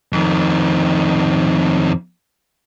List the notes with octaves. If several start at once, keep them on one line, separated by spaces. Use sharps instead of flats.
F2 D#3